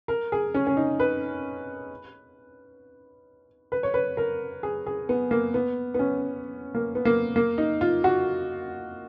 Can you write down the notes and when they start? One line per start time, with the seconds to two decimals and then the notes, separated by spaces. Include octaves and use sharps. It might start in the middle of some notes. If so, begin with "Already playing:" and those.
0.08 A#4
0.32 G#4
0.54 C#4
0.67 C#4
0.77 D#4
1.00 B4
3.72 B4
3.83 C#5
3.94 B4
4.17 A#4
4.63 G#4
4.86 G#4
5.09 B3
5.31 A#3
5.54 B3
5.94 B3
5.99 C#4
6.75 A#3
6.95 B3
7.05 A#3
7.36 A#3
7.58 D#4
7.81 F4
8.04 F#4